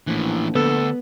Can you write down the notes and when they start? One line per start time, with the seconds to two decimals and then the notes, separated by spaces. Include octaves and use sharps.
0.07 A#1 A2 E3
0.55 D2 B3 A4